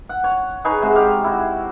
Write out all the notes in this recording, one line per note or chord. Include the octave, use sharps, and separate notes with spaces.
F#5
C#5
D#4 G#4 B4 C#5
C3 G#3 F#4
G4 F5
E4 F#4